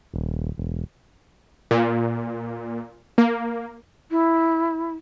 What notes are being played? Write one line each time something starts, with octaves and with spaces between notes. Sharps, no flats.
D#1
E1
A#2
A#3
E4